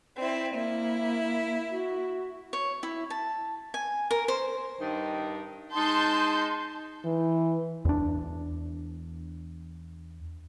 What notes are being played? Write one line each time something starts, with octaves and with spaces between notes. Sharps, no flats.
C4 E4 D5
A#3 E4
F#4
C#5
E4
A5
G#5
A#4
C5
G2 D#3 D#4
G#3 D#4 A5 C6 G6
E3
E2 D4